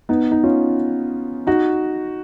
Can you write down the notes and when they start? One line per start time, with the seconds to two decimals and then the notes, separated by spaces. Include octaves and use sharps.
0.09 B3 D#4
0.31 D#4
0.44 C#4 F4
1.47 D#4 F#4